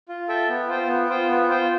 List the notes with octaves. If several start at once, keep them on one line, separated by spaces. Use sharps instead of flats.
F4
A4 E5 G5
B3
F4 C5 G5
B3
F4 C5 G5
B3
F4 C5 G5